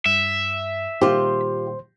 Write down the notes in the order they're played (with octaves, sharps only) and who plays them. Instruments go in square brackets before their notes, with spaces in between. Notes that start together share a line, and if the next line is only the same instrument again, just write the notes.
[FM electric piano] G2 [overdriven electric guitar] E5
[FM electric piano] A#2 D#3 G3 [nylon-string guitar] F4 G4 [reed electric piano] C5 C6